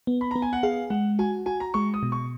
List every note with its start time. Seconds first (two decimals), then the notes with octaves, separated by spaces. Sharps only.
0.07 B3
0.21 B5
0.31 B3 A#5
0.42 G#5
0.53 F#5
0.63 G#4 F5
0.90 G#3 F#5
1.19 F#4 G#5
1.46 F#4 G#5
1.60 A#5
1.74 G#3 C#6
1.94 D#6
2.03 B2
2.12 C#6